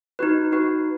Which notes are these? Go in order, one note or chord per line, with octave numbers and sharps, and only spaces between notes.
D#4 F#4 B4
D#4 F#4 B4